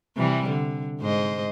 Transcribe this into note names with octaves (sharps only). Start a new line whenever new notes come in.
C3 E3 G3
D3
G#2 C5 D#5